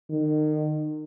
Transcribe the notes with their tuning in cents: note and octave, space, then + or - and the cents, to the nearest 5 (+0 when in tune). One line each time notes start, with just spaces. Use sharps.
D#3 -30